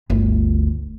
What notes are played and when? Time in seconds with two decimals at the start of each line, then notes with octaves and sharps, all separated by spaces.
0.10 G1 D2